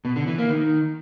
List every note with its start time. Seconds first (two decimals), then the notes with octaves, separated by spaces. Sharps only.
0.05 B2
0.16 D3
0.27 E3
0.38 A#3
0.50 D#3